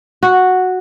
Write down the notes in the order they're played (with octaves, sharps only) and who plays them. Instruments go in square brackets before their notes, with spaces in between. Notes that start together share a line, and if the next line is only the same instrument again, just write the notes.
[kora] F#4